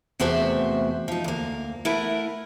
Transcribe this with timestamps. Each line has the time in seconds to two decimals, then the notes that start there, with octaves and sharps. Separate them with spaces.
0.20 E2 C3 A3 F#4 C5 E5
1.08 F3 D#4
1.24 D2 A#3
1.85 A3 E4 A#4 F#5